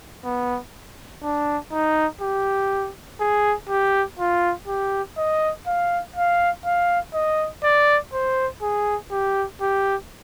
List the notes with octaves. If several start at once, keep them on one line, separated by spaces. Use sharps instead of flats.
B3
D4
D#4
G4
G#4
G4
F4
G4
D#5
F5
F5
F5
D#5
D5
C5
G#4
G4
G4